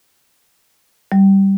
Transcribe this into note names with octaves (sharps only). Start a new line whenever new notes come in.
G3